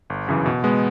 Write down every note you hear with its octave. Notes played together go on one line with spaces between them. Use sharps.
G1
F#2 C#3 E3
B2
G#3 B3